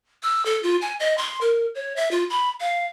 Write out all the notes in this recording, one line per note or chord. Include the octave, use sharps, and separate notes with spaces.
E6
A4
F4
G#5
D#5
C6
A#4
C#5
E5
F4
B5
F5